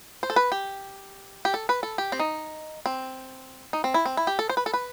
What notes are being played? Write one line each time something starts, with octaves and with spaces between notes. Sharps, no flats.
C5
A4
B4
G4
G4
A4
B4
A4
G4
C4
D#4
C4
D#4
C4
E4
C4
E4
G4
A4
C5
B4
A4
B4